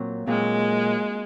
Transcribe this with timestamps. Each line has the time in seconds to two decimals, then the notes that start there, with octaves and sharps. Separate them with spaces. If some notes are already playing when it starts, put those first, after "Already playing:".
Already playing: A#2 F#3 C4
0.27 A#2 F#3 G#3 C4